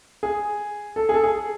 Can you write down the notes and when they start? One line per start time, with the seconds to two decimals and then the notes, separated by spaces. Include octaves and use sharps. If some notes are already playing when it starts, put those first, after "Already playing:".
0.23 G#4
0.96 A4
1.09 G#4
1.14 A4
1.23 G#4